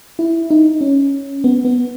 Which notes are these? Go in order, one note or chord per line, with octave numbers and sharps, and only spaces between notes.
E4
D#4
C#4
B3
B3